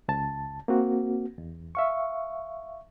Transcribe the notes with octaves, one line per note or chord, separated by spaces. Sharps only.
C#2 A5
A#3 C4 F#4
E2
E5 F5 C#6